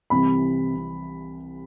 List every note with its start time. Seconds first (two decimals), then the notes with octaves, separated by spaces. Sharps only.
0.10 C2 C3 E3 B5
0.76 C3